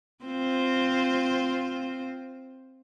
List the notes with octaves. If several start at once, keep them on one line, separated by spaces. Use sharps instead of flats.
C4 F4 C5